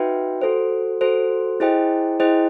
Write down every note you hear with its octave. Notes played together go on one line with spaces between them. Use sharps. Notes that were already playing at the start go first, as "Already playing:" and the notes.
Already playing: D#4 F#4 B4 E5 G5
F#4 A4 C5
F#4 A4 C5
E4 G#4 C5 D#5 G5
E4 G#4 C5 D#5 G5